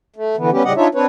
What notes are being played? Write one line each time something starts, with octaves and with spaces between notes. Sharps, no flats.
A3
D3 E3 B3
G3 B3 C#4 G4
A2 C#3 G3 G4 D#5 F#5
D4 D#4 F4 C#5 E5
C4 D4 B4 C#5